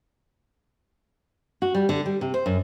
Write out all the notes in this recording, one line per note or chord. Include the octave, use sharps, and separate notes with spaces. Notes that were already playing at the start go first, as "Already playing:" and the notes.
F#4
G3
D3
G3
C3
C5
F#2